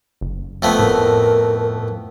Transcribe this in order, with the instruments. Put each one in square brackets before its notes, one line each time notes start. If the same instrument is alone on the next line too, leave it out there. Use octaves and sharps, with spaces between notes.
[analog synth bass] F#1
[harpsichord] F2 A3 B3
[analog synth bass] A2 [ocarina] A#4